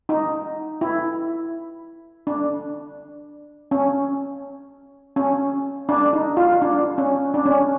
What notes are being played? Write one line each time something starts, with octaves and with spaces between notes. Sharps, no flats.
D#4
E4
D4
C#4
C#4
D4
D#4
F4
D4
C#4
D4
C#4